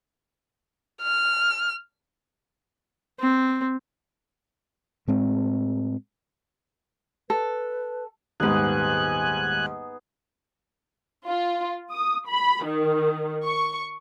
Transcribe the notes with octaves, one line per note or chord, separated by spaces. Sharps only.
F6
C4
A2 G#3 C4
A4 B4
D#1 G#2 B3 D#4 G#4 G#5 F#6
F4
D#6
B5
D#3
C#6